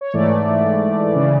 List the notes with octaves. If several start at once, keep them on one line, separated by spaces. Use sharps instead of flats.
C#5
G#2 E3 A3 D5
C#3 E3